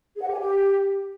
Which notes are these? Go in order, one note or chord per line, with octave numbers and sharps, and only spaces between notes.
G#4
F#5
G4
G#5
G4